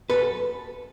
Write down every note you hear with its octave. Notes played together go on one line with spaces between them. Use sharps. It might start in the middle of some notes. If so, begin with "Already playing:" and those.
F#2 A4 B4